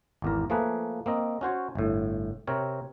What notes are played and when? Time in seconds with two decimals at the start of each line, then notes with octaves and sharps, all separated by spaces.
0.22 G#1 E2 A#4
0.50 F3 A3 A#3 G#4 B4
1.06 A#3 C4 D#5
1.41 C#4 F#4 C5 C#5
1.75 G1 A2
2.47 C3 C4 A#4 C#5